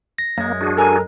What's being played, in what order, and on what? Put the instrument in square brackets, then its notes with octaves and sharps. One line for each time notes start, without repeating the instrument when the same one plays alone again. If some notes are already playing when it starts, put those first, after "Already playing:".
[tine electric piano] A#6
[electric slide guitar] F#2 G#3 [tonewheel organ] A#3
[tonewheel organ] D4 F#4 G#4
[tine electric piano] A4 A#4 A#5 [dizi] G#5